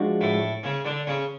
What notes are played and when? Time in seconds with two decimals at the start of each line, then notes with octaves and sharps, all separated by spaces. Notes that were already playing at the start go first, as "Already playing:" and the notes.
Already playing: F3 G#3 D4 F#4
0.21 A2 A3
0.63 C#3 C#4
0.85 D3 D4
1.07 C#3 C#4